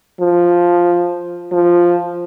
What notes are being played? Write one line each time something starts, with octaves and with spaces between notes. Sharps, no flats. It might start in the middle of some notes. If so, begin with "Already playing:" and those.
F3
F3